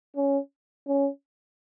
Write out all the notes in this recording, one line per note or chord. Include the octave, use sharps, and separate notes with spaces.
C#4
C#4